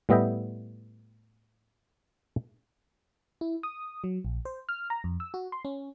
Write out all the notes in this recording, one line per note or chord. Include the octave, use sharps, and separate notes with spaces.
A2 G3 B3 D#5 E5 G5
E4
D#6
F#3
A#1
C5
F6
A#5
F2
E6
F#4
C6
C#4